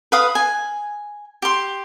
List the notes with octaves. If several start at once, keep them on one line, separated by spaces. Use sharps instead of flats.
B4 F5 D#6
G#5
G4 C6